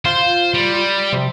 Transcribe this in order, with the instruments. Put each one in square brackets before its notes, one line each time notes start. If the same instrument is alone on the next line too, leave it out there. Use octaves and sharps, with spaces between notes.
[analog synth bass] F4 [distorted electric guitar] C5
[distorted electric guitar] G3
[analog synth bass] C3